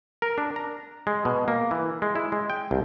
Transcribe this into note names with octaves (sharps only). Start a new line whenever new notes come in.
A#4
D4
A#5
G#3
B2
A#3
E3
G#3
E4
G#3
G5
C2